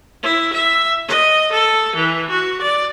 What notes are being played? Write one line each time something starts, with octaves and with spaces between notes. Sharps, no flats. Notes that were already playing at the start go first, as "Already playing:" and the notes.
E4
E5
D#5
A4
E3
F#4
D5